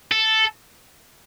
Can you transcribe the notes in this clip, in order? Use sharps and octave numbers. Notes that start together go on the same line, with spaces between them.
A4